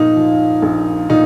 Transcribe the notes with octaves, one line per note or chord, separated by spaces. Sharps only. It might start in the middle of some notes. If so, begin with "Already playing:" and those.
Already playing: A#2 F3 D#4
F3
A#1
A#2 D#4